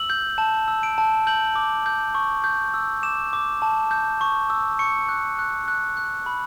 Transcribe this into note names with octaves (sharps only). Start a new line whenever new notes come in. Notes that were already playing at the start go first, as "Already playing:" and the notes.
Already playing: E6 F#7
G6
A5 E7
E6
D7
A5
G6 F#7
D6
G6
C#6
G6
E6
D6 E7
D6
A5
G6
C#6
E6
C#6 C#7
F#6
F#6
F#6
F#6
B5